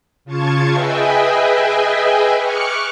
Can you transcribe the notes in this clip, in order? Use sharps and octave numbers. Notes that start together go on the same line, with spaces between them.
C#3 F4 A5 C#6 G#6
G#4 B4 D#5 E5 G5 G#5
C#6 D6 F6 F#6 C#7